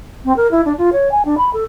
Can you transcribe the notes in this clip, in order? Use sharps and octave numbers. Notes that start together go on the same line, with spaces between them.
C4
A#4
E4
D4
F4
C#5
G#5
D4
B5
A4